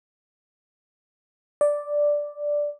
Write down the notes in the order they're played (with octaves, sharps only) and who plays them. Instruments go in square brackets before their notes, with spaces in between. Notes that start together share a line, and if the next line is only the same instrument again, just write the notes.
[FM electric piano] D5